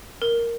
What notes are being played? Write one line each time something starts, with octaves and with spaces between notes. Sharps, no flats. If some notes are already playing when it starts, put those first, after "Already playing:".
A#4